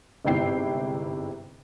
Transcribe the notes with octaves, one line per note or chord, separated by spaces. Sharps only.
G1 G#2 C3 E4 G5 C7